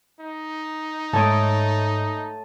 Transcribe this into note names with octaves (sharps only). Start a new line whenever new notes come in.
D#4
G#2 A3 C#5 A5 D#6 D7